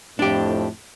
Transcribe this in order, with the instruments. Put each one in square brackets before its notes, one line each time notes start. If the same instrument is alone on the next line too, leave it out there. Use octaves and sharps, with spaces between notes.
[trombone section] F2 A2 [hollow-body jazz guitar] D4 G4